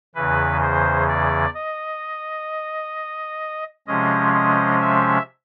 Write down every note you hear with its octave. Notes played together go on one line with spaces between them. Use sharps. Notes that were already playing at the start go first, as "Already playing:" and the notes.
E2 C#3 E3 B4
C5
D5
D#5
C3 F3 G#3 C#4 D#5
D#5
E5